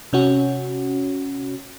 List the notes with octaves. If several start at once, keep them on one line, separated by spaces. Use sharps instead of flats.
C3 C#4 F#4